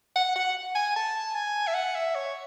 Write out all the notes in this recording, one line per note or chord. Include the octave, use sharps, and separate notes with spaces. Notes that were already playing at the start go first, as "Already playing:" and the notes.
F#5
F#5
G#5
A5
G#5
E5
F#5
E5
C#5